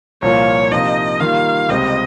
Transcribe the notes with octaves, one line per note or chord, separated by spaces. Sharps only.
C2 A#2 F3 A#3 F4 C#5
C3 F3 A#3 D#4 D#5
D#3 G3 A#3 F4 F5
C#2 C3 G3 C4 D#5